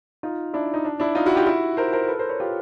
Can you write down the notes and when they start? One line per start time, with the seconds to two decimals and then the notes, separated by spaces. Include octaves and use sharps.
0.23 D#4 F4
0.54 D4 E4
0.74 D#4
0.85 D4
1.00 D4 E4
1.15 D#4 F4
1.26 E4 F#4
1.36 F4 G4
1.46 E4 F#4
1.77 A#4 C5
1.93 A#4 C5
2.08 A4 B4
2.19 A#4 C5
2.29 B4 C#5
2.40 F4 G4